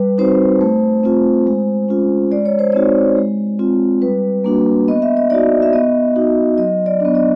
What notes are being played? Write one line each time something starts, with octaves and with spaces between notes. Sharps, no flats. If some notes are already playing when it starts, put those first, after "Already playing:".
Already playing: G3 B4
C4 D#4 F#4 C5
A3
C4 F4
G#3
C#4 F4
G#3 D5
C#5
C5
C4 D#4 F#4 C#5
G#3
C4 F4
G3 B4
A#3 D4 F#4
B3 D#5
E5
D#5
D#4 F#4 D5
E5
B3 D#5
D#4 F#4
F#3 D#5
D5
B3 D4
D#5